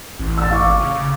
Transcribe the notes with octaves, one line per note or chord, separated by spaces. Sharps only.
A1
E6 A6
F5 C#6 D6
G#1
C#3